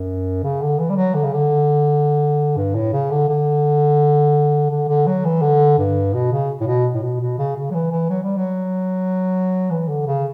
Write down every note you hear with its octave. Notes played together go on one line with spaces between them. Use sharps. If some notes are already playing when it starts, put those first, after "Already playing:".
Already playing: F#2
C#3
D3
E3
G3
F#3
D3
C#3
D3
G2
A2
C#3
D3
D3
D3
D3
F#3
E3
D3
G2
B2
C#3
A2
B2
A2
B2
B2
C#3
C#3
F#3
E3
E3
F#3
G3
F#3
E3
D3
C#3